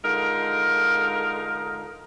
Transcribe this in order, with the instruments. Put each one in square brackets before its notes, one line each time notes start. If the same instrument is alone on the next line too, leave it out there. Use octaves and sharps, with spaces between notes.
[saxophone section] D3 G#3 D#4 F4 A4 A#4